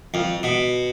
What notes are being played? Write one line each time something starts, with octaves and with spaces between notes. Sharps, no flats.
F2
B2